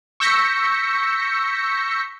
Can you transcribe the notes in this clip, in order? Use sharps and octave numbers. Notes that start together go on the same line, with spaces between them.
C#6 E6 G6 A#6 B6 C#7